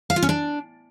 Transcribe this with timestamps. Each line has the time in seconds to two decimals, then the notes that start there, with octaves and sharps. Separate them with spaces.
0.10 F5
0.16 F4
0.23 C#4
0.29 D4